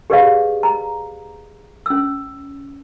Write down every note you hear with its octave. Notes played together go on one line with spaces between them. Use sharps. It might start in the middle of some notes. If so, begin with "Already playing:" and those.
G4 G#4 B4 D5 D#5 F5
A#5
C#4 E6